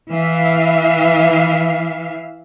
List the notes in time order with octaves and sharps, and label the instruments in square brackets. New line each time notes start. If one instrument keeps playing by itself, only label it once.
[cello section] E3 E5 F5